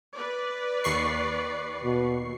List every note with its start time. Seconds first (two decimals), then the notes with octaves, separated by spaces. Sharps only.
0.15 B4 D5
0.84 D#2 C#6 C7
1.84 B2